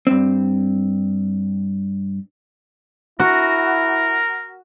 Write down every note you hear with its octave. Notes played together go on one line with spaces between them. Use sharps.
G2 C4
E4 F#4 A#4